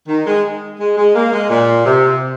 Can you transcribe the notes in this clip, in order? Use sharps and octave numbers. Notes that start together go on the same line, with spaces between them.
D#3
G#3
G#3
G#3
A#3
G#3
A#2
C3